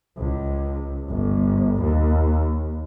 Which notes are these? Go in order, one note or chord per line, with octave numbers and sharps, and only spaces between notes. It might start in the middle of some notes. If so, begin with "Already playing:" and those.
C#2
G1
D#2